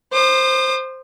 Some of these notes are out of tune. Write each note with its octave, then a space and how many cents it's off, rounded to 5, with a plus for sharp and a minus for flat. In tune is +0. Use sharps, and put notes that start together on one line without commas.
C5 +0 D#6 -45